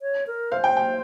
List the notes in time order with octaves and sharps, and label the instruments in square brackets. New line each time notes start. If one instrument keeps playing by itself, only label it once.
[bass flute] C#5
A#4
[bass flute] C5 [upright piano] F5
[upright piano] G5
G5